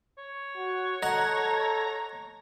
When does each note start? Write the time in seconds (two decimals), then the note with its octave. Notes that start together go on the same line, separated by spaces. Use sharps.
0.18 C#5
0.57 F#4
1.02 A4 D#5 F#5 A#5